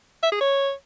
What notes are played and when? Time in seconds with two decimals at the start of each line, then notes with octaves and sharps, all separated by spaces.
0.23 E5
0.32 G#4
0.41 C#5